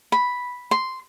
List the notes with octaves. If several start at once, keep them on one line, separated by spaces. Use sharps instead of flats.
B5
C6